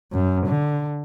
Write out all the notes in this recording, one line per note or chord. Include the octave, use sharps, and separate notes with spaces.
F#2
D3